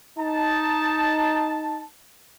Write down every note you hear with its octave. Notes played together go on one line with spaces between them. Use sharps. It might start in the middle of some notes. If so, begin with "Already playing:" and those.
D#4 A5